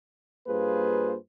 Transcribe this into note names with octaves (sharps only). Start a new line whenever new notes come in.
G2 A#3 F4 G#4 B4 C5